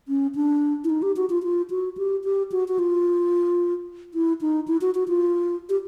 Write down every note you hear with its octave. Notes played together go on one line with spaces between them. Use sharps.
C#4
D4
E4
D#4
G4
F#4
F4
F4
F#4
G4
G4
F#4
F#4
F4
E4
D#4
E4
F#4
F#4
F4
G4